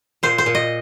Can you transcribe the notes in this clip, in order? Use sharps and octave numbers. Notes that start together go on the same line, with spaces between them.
A#2 C5
C5
A#2
D#5